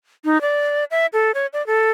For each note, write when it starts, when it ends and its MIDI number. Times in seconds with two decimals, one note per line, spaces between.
0.25 0.41 63
0.41 0.84 74
0.91 1.06 76
1.13 1.31 69
1.34 1.46 73
1.53 1.65 74
1.67 1.91 69